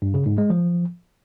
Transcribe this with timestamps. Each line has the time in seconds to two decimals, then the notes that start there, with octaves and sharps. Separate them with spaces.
0.02 G2
0.14 C#3
0.26 G#2
0.38 G#3
0.50 F3